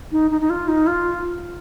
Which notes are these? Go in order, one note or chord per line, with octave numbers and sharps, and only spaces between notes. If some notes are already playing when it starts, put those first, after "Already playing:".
D#4
D#4
D#4
F4
D#4
F4